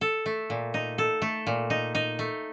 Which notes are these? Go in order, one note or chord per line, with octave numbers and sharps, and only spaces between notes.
A4
A3
A#2
D#4
A4
A3
A#2
D#4
D#4
A3